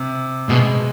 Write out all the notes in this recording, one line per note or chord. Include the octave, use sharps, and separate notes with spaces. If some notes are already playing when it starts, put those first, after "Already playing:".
Already playing: C3
B2 G#3